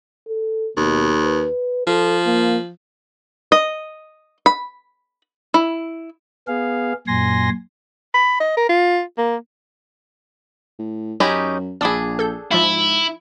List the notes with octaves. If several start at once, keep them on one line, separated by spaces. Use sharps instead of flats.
A4
D#2 B2
B4
F3 A4
A#3
D#5
B5
E4
B3 G#4 F5
F#2 A#2 G#5 C6 A#6
B5
D#5
A#4
F4
A#3
A2
F#2 C#4 D#4 G4 B5 G#6
A#1 D4 G#4 B5 D6 E6
A4 G6
G#2 F3 E4 F4 E5